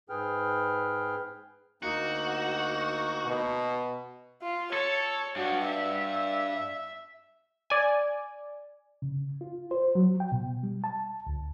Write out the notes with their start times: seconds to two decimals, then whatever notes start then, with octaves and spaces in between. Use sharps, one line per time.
0.09 G#2 G#4 B4 G5 F6
1.83 D2 A#3 D#4 F#4
3.25 B2
4.42 F4
4.73 A4 C#5
5.36 G2 F#4
5.66 E5
7.70 D5 G#5
9.02 C#3
9.41 F4
9.71 C5
9.95 F#3
10.20 G5
10.32 B2
10.63 G3
10.84 A5
11.27 D2